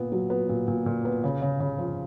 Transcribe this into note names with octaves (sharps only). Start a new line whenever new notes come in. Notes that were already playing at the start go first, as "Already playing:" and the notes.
Already playing: A#2 B3
F#3
B3
A#2
A#2
A#2
B3
C#3
C#3
C#3
F3